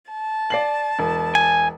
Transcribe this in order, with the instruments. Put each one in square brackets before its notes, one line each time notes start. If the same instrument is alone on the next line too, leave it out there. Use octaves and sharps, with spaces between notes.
[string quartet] A5
[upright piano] D5 C7 F#7
E1
[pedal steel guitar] G#5